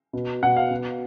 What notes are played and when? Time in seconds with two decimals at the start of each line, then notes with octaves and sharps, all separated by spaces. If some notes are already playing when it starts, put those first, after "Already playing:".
0.13 B2
0.43 B2 F#5
0.56 F5
0.71 B2